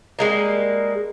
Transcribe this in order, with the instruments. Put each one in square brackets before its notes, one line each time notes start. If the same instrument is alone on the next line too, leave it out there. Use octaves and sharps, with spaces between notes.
[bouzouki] G3 G#3 A#3